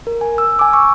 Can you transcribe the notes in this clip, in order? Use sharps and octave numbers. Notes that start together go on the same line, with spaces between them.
A#4
G#5
E6
G#5 D6
C#6 E6